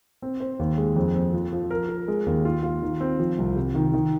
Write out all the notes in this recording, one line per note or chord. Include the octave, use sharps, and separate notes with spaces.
C4
C5
D#2
G#3
F2
C4
F3
F3
A#4
A#4
G#3
D#2
F4
F4
D#3
C4
F3
C2
C3
D#3
D#3